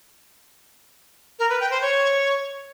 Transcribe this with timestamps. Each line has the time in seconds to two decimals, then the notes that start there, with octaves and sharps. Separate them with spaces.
1.39 A#4
1.50 B4
1.60 G5
1.71 C5
1.81 C#5